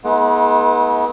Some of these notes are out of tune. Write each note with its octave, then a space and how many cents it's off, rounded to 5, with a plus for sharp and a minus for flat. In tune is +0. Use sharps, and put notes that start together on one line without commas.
G#3 +35 B3 -25 E4 -45